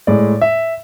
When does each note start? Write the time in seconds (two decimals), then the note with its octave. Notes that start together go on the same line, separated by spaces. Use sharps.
0.07 A2 G#3 D5
0.41 E5